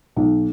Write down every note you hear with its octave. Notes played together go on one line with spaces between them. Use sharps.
B1